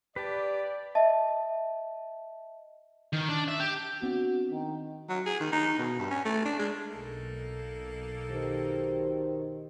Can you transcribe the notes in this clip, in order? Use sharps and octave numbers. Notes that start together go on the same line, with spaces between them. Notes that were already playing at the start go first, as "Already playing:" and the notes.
G4 B4 D5 A5
D#5 E5 A5
D#3
D4
E5
G4
B3 C4 D4 F#4
D#3
F#3
G#4
D#3
D#4
B2
G2
C#4
A3
D4
G#3
B1 A#3 D#4 A4
B2 D#3 G4 C5